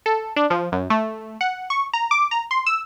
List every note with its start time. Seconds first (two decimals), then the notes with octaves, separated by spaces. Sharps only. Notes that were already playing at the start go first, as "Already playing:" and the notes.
0.06 A4
0.36 D4
0.50 F3
0.72 F#2
0.90 A3
1.41 F#5
1.70 C#6
1.93 A#5
2.11 D6
2.31 A#5
2.51 C6
2.66 E6